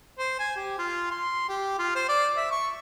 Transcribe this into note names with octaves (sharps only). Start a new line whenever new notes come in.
C5
G#5
G4
F4
C6
G4
F4
C5
D5
E5
C#6